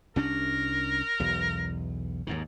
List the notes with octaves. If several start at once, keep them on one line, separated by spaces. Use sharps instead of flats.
C2 C#4 D4 A#4
B1 E2
D#2 G#2 D#3